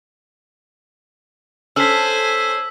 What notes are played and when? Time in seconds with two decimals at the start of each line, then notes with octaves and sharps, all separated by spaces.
1.76 C#4 A4 C5 G#5 E6 B6